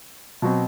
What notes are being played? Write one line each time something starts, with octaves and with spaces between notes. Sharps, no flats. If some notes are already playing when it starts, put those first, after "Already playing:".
B2 F#3 C4